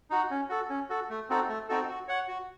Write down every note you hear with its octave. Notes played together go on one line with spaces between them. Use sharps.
D#4 F#4
C#4
F#4 A4
C#4
F#4 A4
A3
C4 D#4 F#4 A4
A3
C4 D#4 F#4 A4
F#4
C#5 F#5
F#4